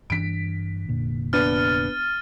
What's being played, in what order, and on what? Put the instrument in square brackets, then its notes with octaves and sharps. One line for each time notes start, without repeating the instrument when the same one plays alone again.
[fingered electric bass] G2 E3 D4 [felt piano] B6 D7
[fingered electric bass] F1 A#2 D3
[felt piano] B3 D4 [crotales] F6 A6 D#7